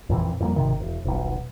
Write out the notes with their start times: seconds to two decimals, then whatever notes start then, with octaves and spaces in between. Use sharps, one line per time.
0.09 A#1 F2 A#2 E3
0.40 F2 G3 A3 A#3
0.56 G#1 C3 D#3
0.80 E1
1.05 D#1 B1